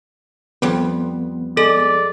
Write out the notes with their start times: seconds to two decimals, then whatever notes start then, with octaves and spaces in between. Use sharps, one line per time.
0.62 F2 G3 B3
1.57 G#3 A4 D5